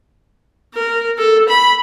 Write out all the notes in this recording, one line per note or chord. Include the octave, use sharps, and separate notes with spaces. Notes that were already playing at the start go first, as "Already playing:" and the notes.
A#4
A4
B5